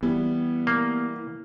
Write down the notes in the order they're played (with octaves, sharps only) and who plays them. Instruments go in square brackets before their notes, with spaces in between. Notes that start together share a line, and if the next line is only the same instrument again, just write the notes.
[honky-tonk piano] E3 G3 [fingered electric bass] B3
[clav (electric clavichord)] A#3